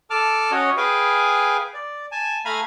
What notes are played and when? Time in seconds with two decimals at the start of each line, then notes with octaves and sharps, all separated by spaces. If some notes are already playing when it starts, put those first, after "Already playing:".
0.10 A4 A5 D6 F6
0.51 C#4 F#4 C#5 D#5
0.77 G#4 B4 F5 G5 G#5
1.74 D5
2.12 G#5 A5
2.45 A3 F5 G#5 A#5 B5